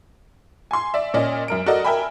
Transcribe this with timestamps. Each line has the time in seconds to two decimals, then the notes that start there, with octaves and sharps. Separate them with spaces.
0.71 G#5 C6
0.94 D5 E5
1.14 A#2 C#4 D5 D#5
1.48 F#2 A#4 D7
1.66 F#4 A4 A#4 D5 D#5
1.85 A#4 E5 G5 G#5 B5